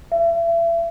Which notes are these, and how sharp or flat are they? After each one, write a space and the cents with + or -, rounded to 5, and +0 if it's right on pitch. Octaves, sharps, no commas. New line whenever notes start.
E5 +35